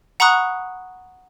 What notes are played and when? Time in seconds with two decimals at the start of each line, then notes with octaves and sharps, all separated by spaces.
0.20 F#5 A#5 B5 C#6 D#6 F#6